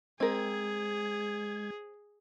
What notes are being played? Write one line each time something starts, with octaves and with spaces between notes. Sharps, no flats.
G#3 C4 G#4 A#4 G#6